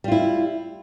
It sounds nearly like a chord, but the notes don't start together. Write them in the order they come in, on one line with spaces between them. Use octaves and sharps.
G3 F4 E4